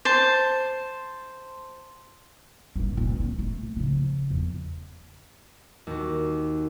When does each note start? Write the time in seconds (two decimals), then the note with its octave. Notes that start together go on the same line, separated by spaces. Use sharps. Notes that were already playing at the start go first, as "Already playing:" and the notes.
0.05 C5 A5
2.76 F#1 G2
2.97 A#2
3.16 B3
3.39 A3
3.76 C#3 F3
4.30 E2
5.87 D#2 F#4